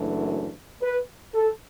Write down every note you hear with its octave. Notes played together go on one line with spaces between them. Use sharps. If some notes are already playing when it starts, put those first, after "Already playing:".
Already playing: F#1 F#2 E3 A3 D4
B4
A4